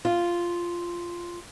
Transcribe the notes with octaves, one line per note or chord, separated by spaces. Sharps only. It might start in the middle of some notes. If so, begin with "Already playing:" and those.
F4